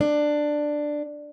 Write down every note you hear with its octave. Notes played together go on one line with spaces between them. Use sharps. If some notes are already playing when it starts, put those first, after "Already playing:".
D4